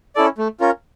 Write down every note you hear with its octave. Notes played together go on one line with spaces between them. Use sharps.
C#4 E4 A4 D5
A3
C#4 F4 A#4